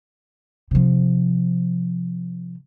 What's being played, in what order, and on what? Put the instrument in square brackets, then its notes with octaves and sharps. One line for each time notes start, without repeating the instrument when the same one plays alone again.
[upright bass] C3 F3